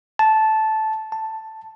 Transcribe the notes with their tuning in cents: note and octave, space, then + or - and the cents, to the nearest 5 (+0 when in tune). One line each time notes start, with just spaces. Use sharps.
A5 -10
A5 +5